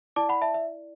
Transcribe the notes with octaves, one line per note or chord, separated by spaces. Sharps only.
E4 D5 A5 D6
F#5 B5
E5 A5
E5